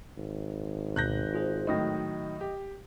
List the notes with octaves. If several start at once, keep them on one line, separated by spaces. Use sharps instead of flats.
G#1
D2 B2 F#6 G6 A#6
F4 G#4 C5
A2 D#3 F#3 D#5 D#6 A#6
G4